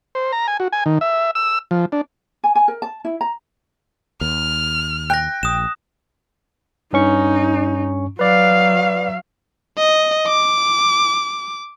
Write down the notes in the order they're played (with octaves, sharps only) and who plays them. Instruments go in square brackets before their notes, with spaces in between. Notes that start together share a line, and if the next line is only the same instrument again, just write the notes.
[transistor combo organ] C5
A#5
G#5
F#4
G#5
D#3
E5
E6
F3
D4
[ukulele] G#5
G#5
A#4
A5
E4
A#5
[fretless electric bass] D#2 [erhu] F6
[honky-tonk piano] G5 [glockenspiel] F#6 A#6
[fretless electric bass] A#1 [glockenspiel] D#6 E7
[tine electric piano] G2 C#4 C#6 [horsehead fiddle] D#4
[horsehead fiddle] F#3 F5 [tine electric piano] B4 D5
[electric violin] D#5
D6